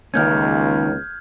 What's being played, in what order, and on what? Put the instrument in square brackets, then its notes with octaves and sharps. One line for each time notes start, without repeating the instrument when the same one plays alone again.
[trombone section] C#2 [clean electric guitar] D#3 A#3 C#4 [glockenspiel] F6 G6 G#6